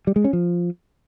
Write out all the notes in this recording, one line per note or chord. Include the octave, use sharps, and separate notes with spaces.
G3
G#3
C#4
F3